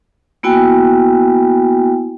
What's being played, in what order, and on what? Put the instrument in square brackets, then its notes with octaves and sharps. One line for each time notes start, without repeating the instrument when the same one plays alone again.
[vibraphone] A#3 B3 E4 F#4 G5 G#5